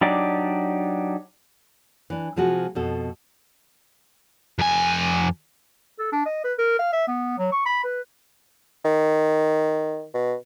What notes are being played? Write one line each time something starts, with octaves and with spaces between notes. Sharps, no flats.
F#3 D4 D#4 G4 D5
E3 D4
C3 F3 G#3 F4 F#4
F2 B2 A4
F2 G#5
A4
D4
D#5
B4
A#4
F5
E5
B3
F#3
C#6
B5
B4
D#3
B2